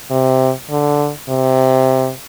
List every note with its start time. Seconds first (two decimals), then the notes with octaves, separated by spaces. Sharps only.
0.11 C3
0.70 D3
1.29 C3